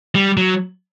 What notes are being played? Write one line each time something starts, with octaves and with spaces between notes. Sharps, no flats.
G3
F#3